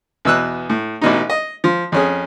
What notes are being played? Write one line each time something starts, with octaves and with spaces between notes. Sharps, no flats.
E2 B2 E6 F#6
A2
A1 B2 D#4
D#5
F3
F2 C#4 G#4